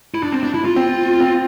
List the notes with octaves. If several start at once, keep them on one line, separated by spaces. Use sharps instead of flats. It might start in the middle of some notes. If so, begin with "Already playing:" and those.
E4
D4
C4
D4
E4
F4
C4
C4